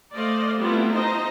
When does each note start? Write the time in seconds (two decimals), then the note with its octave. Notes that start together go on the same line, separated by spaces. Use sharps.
0.14 A3 C5 D5 D#5 F5
0.59 G3 A3 B3 C4 E4 F4
0.93 D#4 C5 D#5 A#5